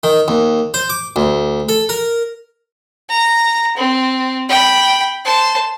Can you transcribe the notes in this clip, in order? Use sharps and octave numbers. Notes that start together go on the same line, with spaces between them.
D#3
D#2
C5
D6
D2
A4
A#4
A#5
C4
G5 B5
C5 A5